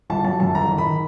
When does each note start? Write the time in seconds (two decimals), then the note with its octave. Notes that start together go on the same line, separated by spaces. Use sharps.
0.10 G1 A5
0.24 F#3 A5
0.40 F#2 A5
0.55 G1 A#5
0.70 D#3
0.78 B5
0.86 D#3